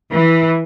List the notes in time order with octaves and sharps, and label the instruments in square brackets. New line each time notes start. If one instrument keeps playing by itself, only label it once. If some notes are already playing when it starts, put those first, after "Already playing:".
[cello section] E3